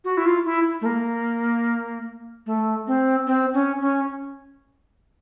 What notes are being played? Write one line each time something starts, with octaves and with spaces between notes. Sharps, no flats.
F#4
E4
F4
E4
A3
A#3
A3
C4
C4
C#4
C#4